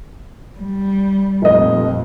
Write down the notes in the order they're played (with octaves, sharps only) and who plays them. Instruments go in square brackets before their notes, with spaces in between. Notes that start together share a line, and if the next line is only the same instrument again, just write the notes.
[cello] G3
[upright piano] F1 D#5 [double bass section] F2 A#2